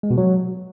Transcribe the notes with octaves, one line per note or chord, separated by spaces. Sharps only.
G#3
B2
F#3